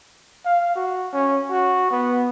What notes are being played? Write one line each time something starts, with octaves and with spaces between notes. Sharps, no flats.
F5
F#4
C#4
F#4
B3